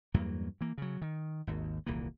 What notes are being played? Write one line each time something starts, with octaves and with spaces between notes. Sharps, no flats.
E2 G2 F#3 A#3
E3 A#3
C#3 F#3
D#3
G#1 D#2
D#1 C2 E3 A#3